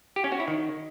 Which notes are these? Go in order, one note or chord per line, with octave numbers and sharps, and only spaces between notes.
G4
C#4
F#4
E4
D#3